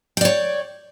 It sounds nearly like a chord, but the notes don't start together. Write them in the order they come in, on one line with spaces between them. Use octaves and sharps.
G5 D5 C#5